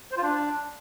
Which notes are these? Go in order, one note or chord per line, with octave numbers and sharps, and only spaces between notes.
C5
F4
D4